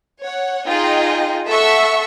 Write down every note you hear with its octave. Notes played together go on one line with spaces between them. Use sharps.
C#5 F#5
D#4 F4 G#4 D#5 G5
A4 E5 F#5 C#6 E6